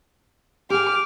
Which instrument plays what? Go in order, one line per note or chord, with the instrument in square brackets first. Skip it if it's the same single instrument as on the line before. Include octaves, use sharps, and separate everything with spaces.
[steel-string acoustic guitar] G4 G#4 [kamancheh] D6 F6